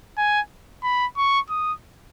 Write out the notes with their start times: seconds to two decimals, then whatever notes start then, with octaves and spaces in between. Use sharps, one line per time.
0.18 G#5
0.84 B5
1.17 C#6
1.50 D#6